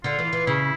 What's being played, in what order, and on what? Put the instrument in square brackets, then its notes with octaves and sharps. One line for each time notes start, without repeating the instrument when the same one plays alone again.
[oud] D3 [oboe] F4
[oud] E3
E3
[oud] C#3 [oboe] E4